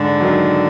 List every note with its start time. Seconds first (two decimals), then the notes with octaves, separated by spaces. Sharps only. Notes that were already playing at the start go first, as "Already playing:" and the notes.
Already playing: G#2 D3
0.19 D#3 F#3